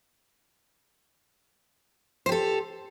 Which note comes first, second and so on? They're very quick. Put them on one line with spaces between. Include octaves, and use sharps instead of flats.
C5 G4 A4